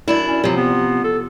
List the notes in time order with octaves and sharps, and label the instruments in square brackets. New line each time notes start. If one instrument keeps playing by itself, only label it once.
[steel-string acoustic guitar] F#2 D4 E4
[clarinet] C#4
[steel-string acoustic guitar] C3 F3 [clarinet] F#3
[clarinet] B3
A4